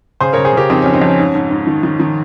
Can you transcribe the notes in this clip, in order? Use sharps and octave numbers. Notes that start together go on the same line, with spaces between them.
C#3 G#4 C5
C#3 A#4 C#5
G#4 C5
C#3 G4 A#4
F2 C4 D#4
F2 C#4
C4 D#4
F2 C#4
G#2
G#2
G#2
D#3
D#3
D#3